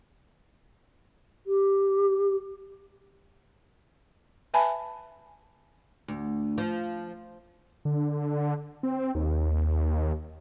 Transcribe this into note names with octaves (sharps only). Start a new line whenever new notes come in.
G4
B4 E5 G#5 A5 B5
D2
F3
D3
C4
D#2